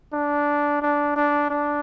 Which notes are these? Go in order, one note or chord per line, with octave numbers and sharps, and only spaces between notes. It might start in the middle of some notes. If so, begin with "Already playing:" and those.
D4
D4
D4
D4